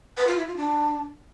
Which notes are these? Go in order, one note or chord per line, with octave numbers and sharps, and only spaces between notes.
B4
F4
E4
F4
D4